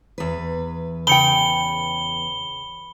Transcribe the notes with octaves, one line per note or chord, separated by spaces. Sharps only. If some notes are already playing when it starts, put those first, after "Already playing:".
E2 B4
C#3 G5 B5 C#7 G7